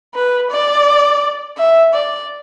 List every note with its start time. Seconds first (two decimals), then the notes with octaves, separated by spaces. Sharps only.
0.15 B4
0.51 D5
1.58 E5
1.94 D5